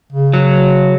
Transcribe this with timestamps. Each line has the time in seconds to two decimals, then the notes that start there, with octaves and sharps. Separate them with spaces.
0.12 C#3
0.33 F#3